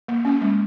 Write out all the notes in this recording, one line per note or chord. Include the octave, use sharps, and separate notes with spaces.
A#3
C#4
G#3